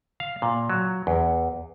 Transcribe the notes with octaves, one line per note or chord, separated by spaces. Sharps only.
F5
A#2
F#3
E2